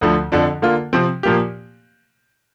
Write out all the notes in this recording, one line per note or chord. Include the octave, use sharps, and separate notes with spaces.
D2 D3 F3
F2 D3 F3 D4
D3 A#3 F4
C3 F3 C4
A#2 F3 A#3 G4